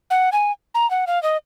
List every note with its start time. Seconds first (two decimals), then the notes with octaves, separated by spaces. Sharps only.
0.10 F#5
0.33 G#5
0.75 A#5
0.91 F#5
1.07 F5
1.23 D#5